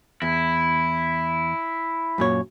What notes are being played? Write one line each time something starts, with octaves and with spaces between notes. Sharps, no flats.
E2 E4
F#2 A#2 C#5